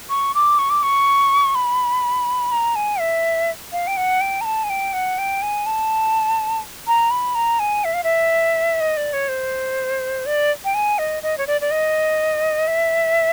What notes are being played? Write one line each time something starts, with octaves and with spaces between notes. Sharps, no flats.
C#6
D6
C#6
D6
C#6
B5
A#5
G#5
E5
F5
G5
F#5
G5
A#5
A5
G#5
G5
F#5
G5
G#5
A5
A#5
B5
A#5
G#5
E5
F5
E5
D#5
D5
C#5
C5
D5
G5
G#5
D#5
D#5
C#5
D5
D5
D#5
E5